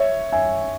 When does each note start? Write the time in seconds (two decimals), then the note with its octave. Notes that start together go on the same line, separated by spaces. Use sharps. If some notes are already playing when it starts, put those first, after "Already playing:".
Already playing: C#5 E5
0.32 E5 G#5